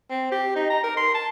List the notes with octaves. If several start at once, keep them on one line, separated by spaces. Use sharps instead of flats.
C4
G4
D#4
A#5
A#4
C6
A5